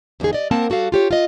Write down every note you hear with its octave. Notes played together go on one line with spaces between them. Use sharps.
E2 A#2 D3 D#4 G#4
D5 D#5
A#3 C4 A#4 F#5 A5
G3 F#4 A4 F5
F4 G4 C#5
F4 D#5